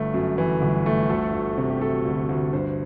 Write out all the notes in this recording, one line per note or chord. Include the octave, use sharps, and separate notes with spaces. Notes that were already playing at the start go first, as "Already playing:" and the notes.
Already playing: G1 A3
F#2
E3
G1
A3
D2 A4
D2
C3
G4
F#3 A4
D2
D2
G2 C5